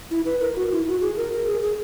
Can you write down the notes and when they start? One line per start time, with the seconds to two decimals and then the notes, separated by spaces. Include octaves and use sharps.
0.11 E4
0.25 B4
0.40 A#4
0.56 F#4
0.72 E4
0.87 F#4
1.01 G#4
1.17 A#4
1.32 A#4
1.47 G#4
1.62 G#4